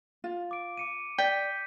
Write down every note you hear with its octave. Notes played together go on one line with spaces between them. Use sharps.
F4
D6 D7
D6 C#7 D#7
D5 G5 G6 B6